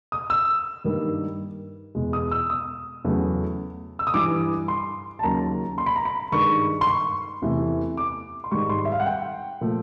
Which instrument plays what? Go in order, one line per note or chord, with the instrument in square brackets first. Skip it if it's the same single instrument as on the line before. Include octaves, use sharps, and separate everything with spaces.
[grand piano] D#6
E6
G2 D#3 G3 A#3
E2 B2 G#3
D#6
E6
D#6
E2 C#3 F#3 A3
E6
D#6
G2 E3 G3 D6
C6
A5
D#2 C#3 F#3 A#5
C6
B5
A#5
B5
G2 D#3 G#3 C#6
C6
C#6
E2 C3 E3 A3
D6
C6
G#2 D#3 G3 C#6
C6
E5
F5
F#5
G5
A#2 F3 A3